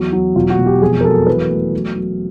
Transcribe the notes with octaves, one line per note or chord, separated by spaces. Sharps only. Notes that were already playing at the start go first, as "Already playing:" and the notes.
Already playing: E2 F#3
F#3
E1 F4
F#4
E1
G4
F2 G#4
A#4
F#3 A4
E3 B4
A3
F#3
F#3